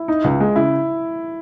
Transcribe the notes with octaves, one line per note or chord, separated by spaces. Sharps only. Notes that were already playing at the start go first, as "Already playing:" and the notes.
Already playing: E4
D#4
C#2
G#3
C#3 E4